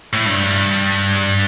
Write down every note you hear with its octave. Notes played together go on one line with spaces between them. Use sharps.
A2
G2